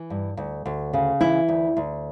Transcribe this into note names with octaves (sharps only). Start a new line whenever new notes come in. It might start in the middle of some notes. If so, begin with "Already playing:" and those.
Already playing: E3
G2
D2
D2
C#3
E3 E4
D2
D2